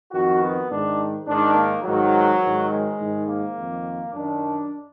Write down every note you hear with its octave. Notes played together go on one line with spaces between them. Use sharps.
F2 D#3 F#4
B3
G#2 D#3 D4
G#2 D#3 D4
A#3
G#2 D#3 F#3
G#2 D#3
G#3
G#2 D#3
A#3
F2 D#3
F#2 D#3 D4